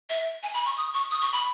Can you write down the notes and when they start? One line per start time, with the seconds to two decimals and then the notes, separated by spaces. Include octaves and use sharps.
0.09 E5
0.43 G#5
0.54 B5
0.66 C#6
0.77 D#6
0.94 C#6
1.11 D#6
1.21 C#6
1.33 B5